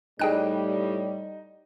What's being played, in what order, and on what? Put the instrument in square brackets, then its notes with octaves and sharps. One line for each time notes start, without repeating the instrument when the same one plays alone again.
[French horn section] A2 G3 [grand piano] D#4 [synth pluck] G#4 G5 F#6